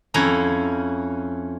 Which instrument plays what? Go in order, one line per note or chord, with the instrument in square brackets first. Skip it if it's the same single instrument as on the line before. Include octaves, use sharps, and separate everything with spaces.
[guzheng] F2 C#4 E4 A#5